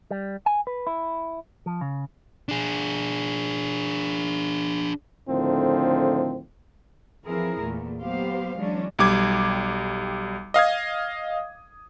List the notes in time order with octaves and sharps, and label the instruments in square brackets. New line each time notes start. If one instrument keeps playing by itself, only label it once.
[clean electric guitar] G3
G#5
B4
E4
F3
C#3
[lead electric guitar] D4 G#4
[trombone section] A2 D3 D#3 F3 C4
[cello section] E3 F3 C4 E4 G#4 A#4
E2 A#2 A3
F#3 A#3 B3 G4 C5 F5
E3 F#3 G#3 C#4 D4
[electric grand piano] B1 G3 D6 G#6
D#5 F5 D#6 G#6